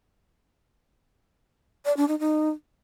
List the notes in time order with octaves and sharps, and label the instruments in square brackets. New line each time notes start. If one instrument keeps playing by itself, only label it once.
[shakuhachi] D5
D4
D#4
D#4